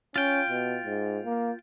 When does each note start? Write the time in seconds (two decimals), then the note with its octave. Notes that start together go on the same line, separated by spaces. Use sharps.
0.16 C#4 F4 G5
0.49 B2
0.85 G#2
1.25 A#3